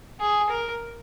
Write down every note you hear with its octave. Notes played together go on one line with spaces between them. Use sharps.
G#4
A#4